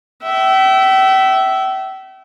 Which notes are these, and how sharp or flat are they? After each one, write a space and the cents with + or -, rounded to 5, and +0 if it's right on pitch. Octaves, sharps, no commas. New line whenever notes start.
E5 +0 G5 -40